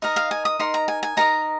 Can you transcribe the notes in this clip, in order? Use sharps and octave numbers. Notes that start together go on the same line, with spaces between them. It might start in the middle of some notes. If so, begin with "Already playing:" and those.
D#4 A#4 D#5
F5
G#5
D#6
D#4 A#4 D#5 C6
A#5
G#5
G#5
D#4 A#4 D#5 A#5